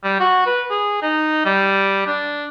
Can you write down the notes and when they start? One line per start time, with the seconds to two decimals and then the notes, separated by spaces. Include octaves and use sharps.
0.04 G3
0.20 F#4
0.46 B4
0.70 G#4
1.02 D#4
1.45 G3
2.06 D4